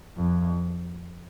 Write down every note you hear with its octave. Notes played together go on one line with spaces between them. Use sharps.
F2